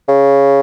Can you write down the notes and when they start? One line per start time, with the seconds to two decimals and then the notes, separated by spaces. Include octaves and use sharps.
0.08 C#3